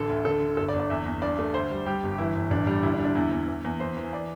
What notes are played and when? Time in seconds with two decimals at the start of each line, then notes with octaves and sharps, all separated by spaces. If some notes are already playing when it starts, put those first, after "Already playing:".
Already playing: A1 D3 A4
0.10 D2
0.25 D3 A4
0.42 D3
0.57 G1 A4
0.68 D5
0.74 G1
0.80 D5
0.90 E2 E5
1.05 E2
1.22 G2 D5
1.39 A3
1.54 D2 C5
1.71 G3
1.86 G3 G4
2.03 G1
2.12 G4
2.18 E3 E4
2.35 G1
2.51 A1 D4
2.67 G3
2.83 D2 E4
2.94 D4
2.99 D2
3.05 D4
3.15 E2 E4
3.31 E2
3.48 E2
3.64 E2
3.80 E2 C5
3.97 E3
4.13 D5